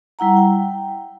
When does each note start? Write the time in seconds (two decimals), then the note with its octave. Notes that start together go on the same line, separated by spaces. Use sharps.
0.19 G3 E4 F#5 A#5
0.37 G5